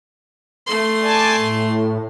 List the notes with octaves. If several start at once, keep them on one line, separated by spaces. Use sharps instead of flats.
A3 C6
D5 G#5 A5
A2